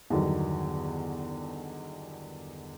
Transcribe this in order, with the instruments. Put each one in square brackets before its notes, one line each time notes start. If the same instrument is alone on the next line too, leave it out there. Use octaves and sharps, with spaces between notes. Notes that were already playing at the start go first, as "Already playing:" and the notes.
[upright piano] E2 G2 D3 D#3 F#3